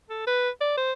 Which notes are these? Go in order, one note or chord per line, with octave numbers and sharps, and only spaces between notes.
A4
B4
D5
C5